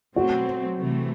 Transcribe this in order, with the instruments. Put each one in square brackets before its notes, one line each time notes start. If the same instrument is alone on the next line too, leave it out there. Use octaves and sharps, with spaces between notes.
[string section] B2 F#3 A3 C4 [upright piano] F#4
[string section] C3 E3 A3